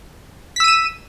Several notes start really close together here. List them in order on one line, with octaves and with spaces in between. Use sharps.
B6 E6 D#7 E7